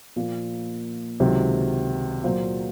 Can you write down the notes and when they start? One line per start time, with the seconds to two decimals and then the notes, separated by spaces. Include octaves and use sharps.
0.16 A#2 F3 A#3 F4
1.20 C#2 C3 D#3 F#3
2.24 A#2 F#3 A#3 F4 C5